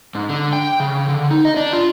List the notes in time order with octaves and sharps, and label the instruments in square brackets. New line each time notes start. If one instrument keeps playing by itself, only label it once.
[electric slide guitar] G#2
D3
G5
C#3
D3
D#4
D#5
D4
F4